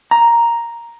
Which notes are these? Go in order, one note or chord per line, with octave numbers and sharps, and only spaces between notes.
A#5